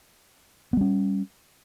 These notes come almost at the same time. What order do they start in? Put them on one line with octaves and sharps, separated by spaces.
B3 G3 C#4